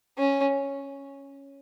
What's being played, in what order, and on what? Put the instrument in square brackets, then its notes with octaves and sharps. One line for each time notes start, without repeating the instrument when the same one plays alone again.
[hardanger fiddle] C#4